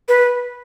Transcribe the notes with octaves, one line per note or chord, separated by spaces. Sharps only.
B4